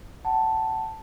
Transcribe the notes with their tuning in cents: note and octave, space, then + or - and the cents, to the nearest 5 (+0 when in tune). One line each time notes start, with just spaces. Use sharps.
F#5 +30 A5 +0